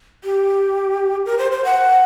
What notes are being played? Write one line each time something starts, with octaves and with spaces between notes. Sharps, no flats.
G4
A#4
C5
C5
F#5